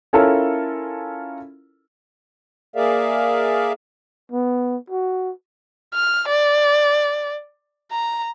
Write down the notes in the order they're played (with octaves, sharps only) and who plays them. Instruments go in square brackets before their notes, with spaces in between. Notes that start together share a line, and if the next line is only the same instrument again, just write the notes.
[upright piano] C#4 E4 F4 A4 A#4
[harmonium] A#3 G#4 A#4 D5 E5 F5
[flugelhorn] B3
F#4
[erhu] F6
D5
A#5